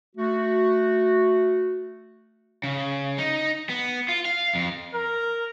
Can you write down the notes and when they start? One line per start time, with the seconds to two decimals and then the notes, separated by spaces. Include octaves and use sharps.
0.16 A3 F#4
2.64 C#3
3.18 D#4
3.69 B3
4.08 F4
4.25 F5
4.55 F2
4.94 A#4